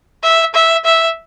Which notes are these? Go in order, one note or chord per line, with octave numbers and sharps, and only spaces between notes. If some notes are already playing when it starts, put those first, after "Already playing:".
E5
E5
E5